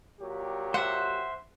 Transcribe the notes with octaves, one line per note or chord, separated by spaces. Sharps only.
A#2 F#3 G4
C5 E5 F#5